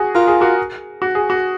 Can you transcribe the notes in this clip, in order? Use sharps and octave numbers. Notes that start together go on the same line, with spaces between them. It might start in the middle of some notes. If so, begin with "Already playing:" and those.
Already playing: F#4 G#4
F4 A#4
G#4
F#4 A#4
F#4
G#4
F#4